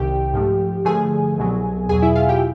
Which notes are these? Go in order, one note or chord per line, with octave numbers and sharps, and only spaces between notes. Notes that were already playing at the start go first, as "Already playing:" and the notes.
Already playing: C2 C3 D#3 G4 G5
G#2 F3 A3
G2 D3 F3 A3 G#4 G#5
C2 B2 F#3
E2 B2 F#3 G#4 G#5
E4 E5
F4 F5
G4 G5